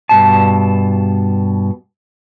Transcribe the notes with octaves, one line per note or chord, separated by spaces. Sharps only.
G2 B2 A5